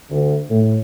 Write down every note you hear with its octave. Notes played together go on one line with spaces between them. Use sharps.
D2
A2